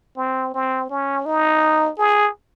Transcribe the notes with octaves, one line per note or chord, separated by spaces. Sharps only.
C4
C4
C#4
D#4
G#4